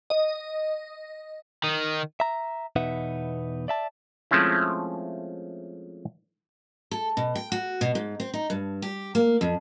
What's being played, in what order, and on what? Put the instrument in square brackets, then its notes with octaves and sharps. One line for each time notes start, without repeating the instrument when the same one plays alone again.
[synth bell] D#5
[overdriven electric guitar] D#3
[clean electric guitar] E5 A#5
E2 B2 D#4 B4 E5 F#5
D5 E5 A5
[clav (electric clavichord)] F3 G#3 A3 C4 C#4 E4
[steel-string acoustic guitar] A4
B2
G5
F#4
B2
G#2
C4
D#4
G2
G4
A#3
F2